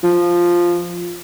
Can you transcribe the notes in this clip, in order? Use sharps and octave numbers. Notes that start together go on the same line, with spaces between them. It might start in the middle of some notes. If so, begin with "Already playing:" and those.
F3